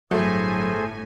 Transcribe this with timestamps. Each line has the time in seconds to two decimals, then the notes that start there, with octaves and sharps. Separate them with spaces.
0.11 G1 A2 F#3 A3 G#4 A4 C5 G#5